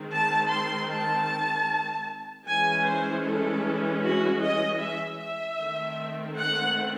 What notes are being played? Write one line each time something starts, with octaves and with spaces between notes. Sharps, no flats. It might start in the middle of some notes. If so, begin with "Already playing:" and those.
Already playing: D#3 G#3 C4
A5
C6
A5
E3 G#3 C#4 G#5
C5
A4
F#4
D#5
E5
E5
D#3 A3 C4
F#5